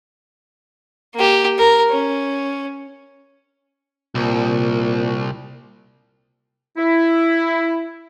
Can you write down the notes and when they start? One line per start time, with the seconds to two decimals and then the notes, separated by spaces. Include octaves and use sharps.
1.15 A#3 G4
1.59 A#4
1.90 C#4
4.15 C2 A#2
6.78 E4